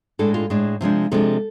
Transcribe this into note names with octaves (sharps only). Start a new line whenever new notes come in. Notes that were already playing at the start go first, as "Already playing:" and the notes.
A2 G#3 D4 A4
F4
A2 G#3 D4
C3 F3 G#3 D4
C3 F3 G#3 D4 A4